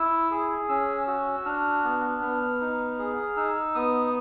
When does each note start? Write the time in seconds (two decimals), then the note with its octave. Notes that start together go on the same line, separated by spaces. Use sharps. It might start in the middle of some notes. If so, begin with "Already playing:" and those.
Already playing: E4 E6
0.31 G#4
0.69 C#4 E6
1.07 F#4 E6
1.45 D4 F6
1.84 B3
2.22 B3
2.60 D#4
2.99 G#4
3.37 D#4 E6
3.75 B3 D#6